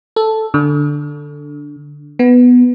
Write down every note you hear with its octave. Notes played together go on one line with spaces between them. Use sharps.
A4
D3
B3